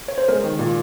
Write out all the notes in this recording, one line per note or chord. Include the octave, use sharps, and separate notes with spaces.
C#5
C5
G#3 A#4
D#3
A#2